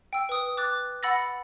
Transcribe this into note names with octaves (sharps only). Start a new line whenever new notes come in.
G5 E6
B4 D#6
D6 F#6 A6
F#5 B5 E6 A6 A#6